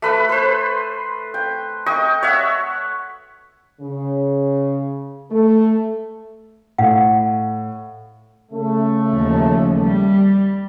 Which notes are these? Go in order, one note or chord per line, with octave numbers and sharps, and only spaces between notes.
A3 B4 B5
B4 C5
G5
D#5 G5 C#6
C#5 E5 F#5
C#3
A3
A2 F5 F#5
C#3 A3
D#2 F3
G3